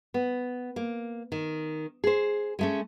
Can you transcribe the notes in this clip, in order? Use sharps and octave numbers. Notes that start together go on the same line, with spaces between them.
B3
A#3
D#3
G#4 C5
G#3 A3 C#4